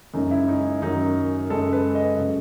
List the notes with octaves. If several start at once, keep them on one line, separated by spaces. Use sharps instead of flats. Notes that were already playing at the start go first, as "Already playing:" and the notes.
F#2 C#3 G#3 D#4
E4
D#4
F#2 D#3 F#3 D#4
F#2 C#3 G#3 A4
B4
D#5
C#3 F#3